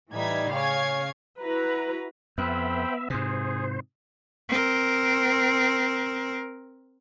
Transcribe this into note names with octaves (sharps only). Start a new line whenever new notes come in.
A2 E3 G3 D#4 G#6 B6
C#3 C#5 F5 G#5 G#6
E4 F#4 B4 A#5
F2 B3 C5 E5 G5 B5
G#2 C3 G#4 C5
C4 A#4